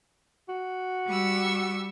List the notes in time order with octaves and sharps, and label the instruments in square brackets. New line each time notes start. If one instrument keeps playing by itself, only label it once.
[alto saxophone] F#4
[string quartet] G3 C#6 E6